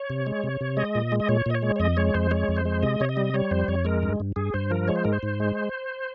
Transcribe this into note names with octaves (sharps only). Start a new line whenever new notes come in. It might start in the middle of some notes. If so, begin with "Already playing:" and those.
Already playing: C#5
C3
G#3
C3
C3
G#3 D#5
A#2
G#3
D#5
A#2 C#5
A#2 D#5
C#5
G#3
C#5
F2 D#5
G#3 C#5
F2 C5
G#3 C#5
F2
C5
G#3
C3 D#5
C3 C#5
D#5
G3
G3 C#5
F2 C5
F2 C#5
G#3 A#4
G2
G2
G2 G#4
G2 C5
F3 A#4
G#3 C#5
C5
G#2 A#4
C5
G#2
G#3